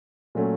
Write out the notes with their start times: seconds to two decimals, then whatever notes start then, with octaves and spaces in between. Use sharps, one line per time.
0.35 A#2 F#3 A3 C#4